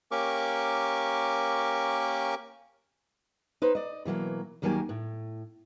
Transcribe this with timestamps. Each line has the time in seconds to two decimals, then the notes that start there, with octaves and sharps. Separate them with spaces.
0.11 A#3 C#4 G4 A#4 C#6 D6
3.62 D#4 B4 C5
3.75 D5 D#5
4.05 B2 E3 F#3 A#3
4.62 D#2 D#3 F#3 G3 A#3 G#5
4.89 A2